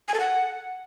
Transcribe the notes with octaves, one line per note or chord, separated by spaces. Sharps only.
G#5
A4
F#5